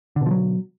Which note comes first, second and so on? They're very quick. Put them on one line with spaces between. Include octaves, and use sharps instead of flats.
D3 B2 F3 F#3